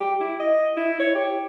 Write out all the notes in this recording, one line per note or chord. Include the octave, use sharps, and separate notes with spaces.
G4
E4
D#5
E4
C#5
G4